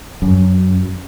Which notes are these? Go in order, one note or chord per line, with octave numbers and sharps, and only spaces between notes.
F#2